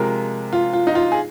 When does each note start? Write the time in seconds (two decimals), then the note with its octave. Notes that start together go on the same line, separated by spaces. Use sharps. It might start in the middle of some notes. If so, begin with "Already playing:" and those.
Already playing: C3 F3 G#3 A#4
0.53 F4
0.73 F4
0.87 D#4
0.95 F4
1.12 G#4